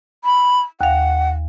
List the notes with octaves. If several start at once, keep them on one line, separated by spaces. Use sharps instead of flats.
B5
D#2 F5 F#5